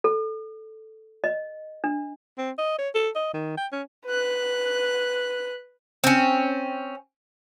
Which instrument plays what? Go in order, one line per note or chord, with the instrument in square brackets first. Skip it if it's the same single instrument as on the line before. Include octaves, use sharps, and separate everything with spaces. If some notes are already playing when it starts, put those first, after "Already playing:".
[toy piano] A4
D#5
D4
[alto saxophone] C4
D#5
C#5
A4
D#5
D#3
G5
C#4
[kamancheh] B4 F#6
[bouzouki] C4 C#4